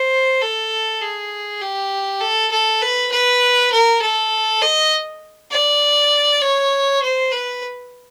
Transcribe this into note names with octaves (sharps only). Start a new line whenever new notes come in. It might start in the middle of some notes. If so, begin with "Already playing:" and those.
Already playing: C5
A4
G#4
G4
A4
A4
B4
B4
A#4
A4
D#5
D5
C#5
C5
B4